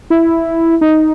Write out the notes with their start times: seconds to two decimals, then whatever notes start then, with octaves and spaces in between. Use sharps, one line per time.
0.10 E4
0.81 D#4